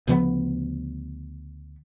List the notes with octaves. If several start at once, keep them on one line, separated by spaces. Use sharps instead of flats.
D2 C#3 F3 B3